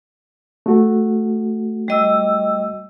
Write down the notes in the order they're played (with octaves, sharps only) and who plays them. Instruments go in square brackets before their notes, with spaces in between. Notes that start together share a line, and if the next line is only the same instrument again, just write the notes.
[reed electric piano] A3 F#4
[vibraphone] G3 D#5 E6